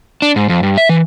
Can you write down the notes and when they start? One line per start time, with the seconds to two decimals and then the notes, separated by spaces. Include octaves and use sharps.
0.22 D4
0.36 G#2
0.49 F2
0.63 G2
0.78 E5
0.89 E3